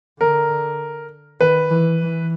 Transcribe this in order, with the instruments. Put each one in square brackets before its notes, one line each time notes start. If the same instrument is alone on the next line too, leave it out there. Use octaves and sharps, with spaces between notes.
[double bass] D3 [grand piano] A#4
[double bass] D#3 [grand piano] B4
[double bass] E3
E3